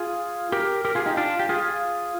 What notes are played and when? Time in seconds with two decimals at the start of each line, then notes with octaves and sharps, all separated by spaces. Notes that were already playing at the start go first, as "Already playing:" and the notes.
Already playing: F4 G#4
0.52 G4 A#4
0.85 G4 A#4
0.95 F4 G#4
1.06 D#4 G4
1.17 D4 F4
1.39 G4
1.49 F4 G#4